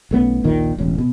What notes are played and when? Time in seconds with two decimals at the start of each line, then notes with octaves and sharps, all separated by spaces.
0.11 B1 A3 B3 C#4
0.44 A#1 D#2 A#2 D#3
0.78 E1 A1 C#4
0.98 B2